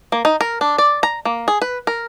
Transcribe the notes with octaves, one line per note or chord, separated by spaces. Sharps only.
A#3
D#4
A#4
D4
D5
A#5
A#3
G#4
B4
A#4